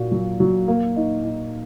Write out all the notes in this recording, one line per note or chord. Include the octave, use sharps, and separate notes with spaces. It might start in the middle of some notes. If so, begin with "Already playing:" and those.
Already playing: A#2 F#4
F#3
F#3
A#3
D#4
D#4